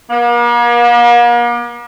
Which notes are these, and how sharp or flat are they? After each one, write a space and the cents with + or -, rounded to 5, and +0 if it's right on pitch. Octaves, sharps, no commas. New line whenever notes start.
A#3 +40